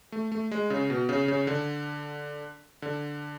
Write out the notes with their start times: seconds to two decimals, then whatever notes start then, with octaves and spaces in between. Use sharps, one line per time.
0.12 A3
0.32 A3
0.51 G#3
0.70 C#3
0.90 B2
1.09 C#3
1.28 C#3
1.47 D3
2.82 D3